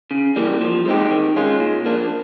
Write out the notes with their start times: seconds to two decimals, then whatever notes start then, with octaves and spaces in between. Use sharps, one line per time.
0.11 C#3
0.36 E3 G3 A#3
0.61 F3
0.86 G#3 C4 D#4 G4
1.10 D#3
1.36 G#3 C#4 F4
1.60 A#2
1.86 F3 A#3 D4